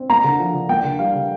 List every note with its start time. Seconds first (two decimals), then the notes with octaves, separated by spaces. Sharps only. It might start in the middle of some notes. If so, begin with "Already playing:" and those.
Already playing: C4
0.10 A#3 A#5
0.24 D3
0.39 F3
0.54 D3
0.69 A#3 G5
0.85 D3
0.99 G3 F5
1.15 D3